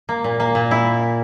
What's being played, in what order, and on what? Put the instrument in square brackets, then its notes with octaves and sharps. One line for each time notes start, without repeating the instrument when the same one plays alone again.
[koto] A#3
A#2
A#3
A#2
E4